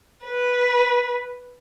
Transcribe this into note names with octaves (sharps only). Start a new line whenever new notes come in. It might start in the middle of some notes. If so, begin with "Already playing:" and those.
B4